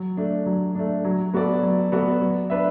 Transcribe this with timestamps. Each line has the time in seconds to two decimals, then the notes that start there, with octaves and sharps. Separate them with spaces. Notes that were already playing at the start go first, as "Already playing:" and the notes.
Already playing: F#3
0.17 A3 D4
0.46 F#3
0.75 A3 D4
1.05 F#3
1.34 B3 F#4 A4 D5
1.63 F#3
1.92 B3 F#4 A4 D5
2.21 F#3
2.50 D4 B4 E5